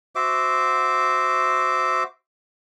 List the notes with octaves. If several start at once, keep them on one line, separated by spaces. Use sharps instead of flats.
F#4 C5 E5 D6